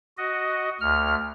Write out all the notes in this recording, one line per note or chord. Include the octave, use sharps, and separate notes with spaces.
F#4 D#5
D2 F6